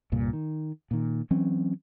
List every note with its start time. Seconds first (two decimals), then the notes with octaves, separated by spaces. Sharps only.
0.12 C2 G2 A#2
0.33 D#3
0.91 A#2 D#3
1.31 E3 F#3 C4 C#4